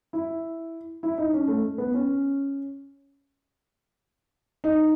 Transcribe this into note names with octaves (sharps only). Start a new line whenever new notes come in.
E4
E4
D#4
C#4
A3
B3
C#4
D#4